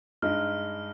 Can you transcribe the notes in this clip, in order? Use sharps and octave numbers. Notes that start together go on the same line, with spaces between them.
G2 G#3 D#4 F6